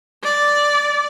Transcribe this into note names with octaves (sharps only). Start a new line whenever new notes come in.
D5